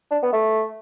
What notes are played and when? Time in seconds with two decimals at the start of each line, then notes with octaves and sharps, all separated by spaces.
0.11 D4
0.23 B3
0.33 A3